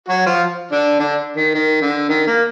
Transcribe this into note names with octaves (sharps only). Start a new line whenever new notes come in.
F#3 F#4
F3 F4
D3 D4
D3 D4
D#3
D#3
D3
D#3
A#3